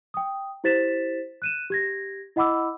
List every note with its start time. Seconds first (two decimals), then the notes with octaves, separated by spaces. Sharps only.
0.14 G5 D#6
0.64 E4 G4 C5 A6 B6 E7
1.42 F#6 D#7 E7
1.70 G4 G#6 A#6
2.36 E4 D#5 F#5 B5 D6 E6